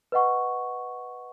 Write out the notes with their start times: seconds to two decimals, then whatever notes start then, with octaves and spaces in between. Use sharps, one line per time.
0.12 B4 D#5 F#5 C#6